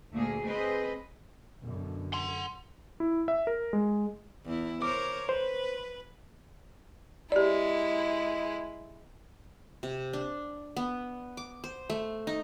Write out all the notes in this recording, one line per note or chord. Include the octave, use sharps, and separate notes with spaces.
D2 A#2 A3 A#3 G#4
C4 G#4 B4 C5 D#5
F#2 B2 D3
F#5 C6
E4
E5
A#4
G#3
E2 E4
A#4 C5 C#5 D6
B4 C5
G#3 E4 G4 D5
C3
D4
B3
D6
C5
A3
D#4